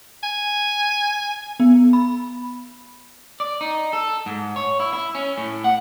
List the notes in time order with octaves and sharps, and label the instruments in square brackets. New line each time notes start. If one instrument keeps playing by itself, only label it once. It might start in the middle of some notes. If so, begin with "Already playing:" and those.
[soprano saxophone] G#5
[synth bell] B3
B5
[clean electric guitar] D5
D#4
A4
G#2
C#5
E4
E4
C#4
A2
F#5